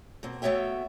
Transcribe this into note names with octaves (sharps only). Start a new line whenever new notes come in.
B2 A#3 C4
A3 B3 F#4 C#5 E5 G5